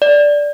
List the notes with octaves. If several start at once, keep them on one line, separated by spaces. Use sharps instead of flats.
D5